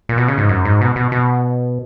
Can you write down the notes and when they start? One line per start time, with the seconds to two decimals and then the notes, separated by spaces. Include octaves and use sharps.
0.09 A#2
0.17 B2
0.28 C#3
0.38 G#2
0.49 F#2
0.65 G#2
0.81 B2
0.96 B2
1.12 B2